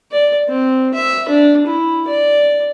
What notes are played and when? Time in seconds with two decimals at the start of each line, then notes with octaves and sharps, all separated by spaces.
0.11 D5
0.48 C4
0.94 E5
1.29 D4
1.66 E4
2.07 D5